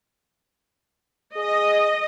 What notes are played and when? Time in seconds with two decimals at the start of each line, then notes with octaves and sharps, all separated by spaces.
1.36 G#4 D#5